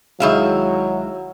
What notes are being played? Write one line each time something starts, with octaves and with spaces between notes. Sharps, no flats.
C2 D#3 F#3 G#3 E4 E5 F5